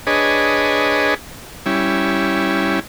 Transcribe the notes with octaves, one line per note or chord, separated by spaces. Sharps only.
D4 G#4 B4 C#5 D#5
G3 C#4 E4